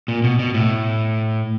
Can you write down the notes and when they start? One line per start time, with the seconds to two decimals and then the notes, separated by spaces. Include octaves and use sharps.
0.08 A#2
0.24 B2
0.39 B2
0.54 A2